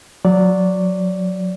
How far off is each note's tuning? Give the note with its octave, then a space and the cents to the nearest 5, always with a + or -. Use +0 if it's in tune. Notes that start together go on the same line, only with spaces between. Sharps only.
F#3 -20 D5 -15